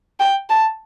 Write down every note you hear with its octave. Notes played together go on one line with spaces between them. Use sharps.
G5
A5